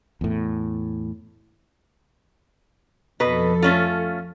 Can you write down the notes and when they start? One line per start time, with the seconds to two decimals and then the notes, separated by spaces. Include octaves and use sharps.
0.21 E2 A2
3.20 F2 B2 F3 A4 B4
3.62 A3 C#4 F4